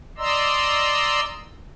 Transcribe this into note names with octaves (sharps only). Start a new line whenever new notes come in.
D5 D#5 A#5 C6 E6